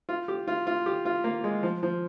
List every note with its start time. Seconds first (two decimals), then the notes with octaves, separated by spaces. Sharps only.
0.09 F4
0.28 G4
0.48 F4
0.67 F4
0.86 G4
1.05 F4
1.24 A#3
1.44 G#3
1.63 F3
1.83 F3